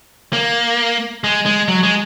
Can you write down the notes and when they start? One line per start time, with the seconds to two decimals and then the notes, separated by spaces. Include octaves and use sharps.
0.33 A#3
1.24 G#3
1.46 G#3
1.68 F#3
1.83 G#3